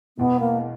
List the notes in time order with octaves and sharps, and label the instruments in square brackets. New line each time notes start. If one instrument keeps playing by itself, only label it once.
[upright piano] E1 E2 B2 [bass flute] B3
[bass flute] A#3